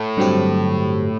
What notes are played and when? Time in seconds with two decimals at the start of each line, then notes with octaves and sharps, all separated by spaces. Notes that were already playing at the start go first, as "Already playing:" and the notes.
Already playing: A2
0.17 G2 D3 F#3 C4 G4